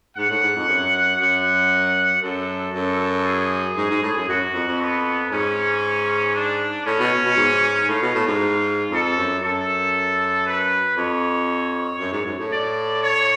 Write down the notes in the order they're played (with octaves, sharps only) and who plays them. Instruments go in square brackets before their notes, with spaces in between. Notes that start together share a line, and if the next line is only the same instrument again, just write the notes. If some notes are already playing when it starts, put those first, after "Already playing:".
[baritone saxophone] G#2 [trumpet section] F#5
[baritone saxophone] A2
G#2
F2
F#2
[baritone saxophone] F#2 [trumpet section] F#5
[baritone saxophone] F#2 [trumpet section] A4
[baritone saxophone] F#2
[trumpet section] G#4
[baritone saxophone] G#2
G#2
A2
F#2
[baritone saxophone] F#2 [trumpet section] F#4
[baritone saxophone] F2
F2
[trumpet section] B3
[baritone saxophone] G#2 [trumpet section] C#4
[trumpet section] D4
[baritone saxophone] A2 [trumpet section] C#4
[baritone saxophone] B2
B2
G#2
[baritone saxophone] A2 [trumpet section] F4
[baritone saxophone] B2
A2
G#2
[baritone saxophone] F2 [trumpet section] A4
[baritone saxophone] F#2
[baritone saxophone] F#2 [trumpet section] A4
[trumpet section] B4
[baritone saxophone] F2 [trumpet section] C#5
[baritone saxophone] F#2
G#2
F#2
A2
[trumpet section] D5
C#5